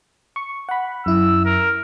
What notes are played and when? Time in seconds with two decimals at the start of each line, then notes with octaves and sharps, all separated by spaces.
0.36 C#6
0.69 F#5 B5
1.06 F#2 E4 E6
1.45 A#4